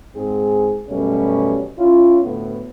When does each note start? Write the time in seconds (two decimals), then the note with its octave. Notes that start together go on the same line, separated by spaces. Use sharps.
0.16 G#2 C4 G#4
0.90 F#2 B2 G3 A3 C#4
1.79 C#4 E4 F4
2.24 D2 A2 B3